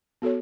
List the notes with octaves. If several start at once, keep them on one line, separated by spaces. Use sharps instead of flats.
B3 F#4 A4 C#5